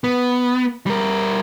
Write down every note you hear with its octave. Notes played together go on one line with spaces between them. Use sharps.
B3
G3 A#4